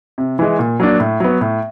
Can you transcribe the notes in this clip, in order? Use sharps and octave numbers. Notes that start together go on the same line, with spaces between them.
C3
E3 G#3
A#2
F#3 A#3 D4
A2
F#3 B3
A2